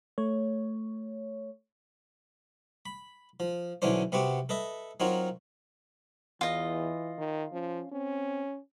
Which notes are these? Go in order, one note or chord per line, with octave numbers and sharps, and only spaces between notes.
A3 C#5
B5
F3
B1 D3 E3 C#4 D4 C5
C3 B3 C4 F#4 G4
A4 B4 D#5 E5
F#3 C4 D#4 F4 F#4 A#4
E2 E3 F4 D#5
D#3
F3 C#4
C4 C#4